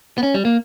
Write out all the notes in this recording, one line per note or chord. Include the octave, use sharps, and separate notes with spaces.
B3
C#4
G3
A#3